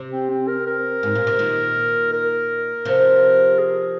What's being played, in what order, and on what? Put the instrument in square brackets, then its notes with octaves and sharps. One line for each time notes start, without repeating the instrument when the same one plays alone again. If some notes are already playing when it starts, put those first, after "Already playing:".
Already playing: [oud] C3
[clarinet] C4
C4
A#4
A#4
[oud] G#2
A#2
C3
A#2 D#3
[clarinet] A#4
[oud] C3 F3
[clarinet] G#4